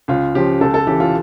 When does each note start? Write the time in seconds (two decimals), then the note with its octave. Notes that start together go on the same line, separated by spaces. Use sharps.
0.08 C#2 F4
0.35 C#3 F3 G4
0.61 C#2 A4
0.74 A4
0.87 C#3 E3 G4
1.00 F4